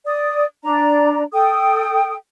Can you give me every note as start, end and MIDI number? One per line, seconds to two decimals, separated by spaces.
0.06 0.44 74
0.06 0.44 87
0.64 1.23 62
0.64 1.23 74
0.64 1.23 82
1.33 2.14 69
1.33 2.14 79
1.33 2.14 87